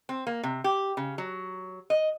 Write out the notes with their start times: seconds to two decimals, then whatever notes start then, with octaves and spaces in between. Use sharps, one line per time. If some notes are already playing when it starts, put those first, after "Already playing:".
0.09 C4
0.27 A#3
0.43 C3
0.64 G4
0.97 C#3
1.18 F#3
1.90 D#5